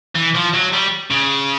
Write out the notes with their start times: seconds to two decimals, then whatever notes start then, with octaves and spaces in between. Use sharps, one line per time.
0.15 E3
0.34 F3
0.53 F#3
0.73 G3
1.11 C#3